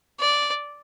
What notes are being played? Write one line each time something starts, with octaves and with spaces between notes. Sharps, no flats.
D5